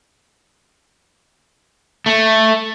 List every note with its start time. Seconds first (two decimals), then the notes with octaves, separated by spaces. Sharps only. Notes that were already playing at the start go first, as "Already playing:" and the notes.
2.06 A3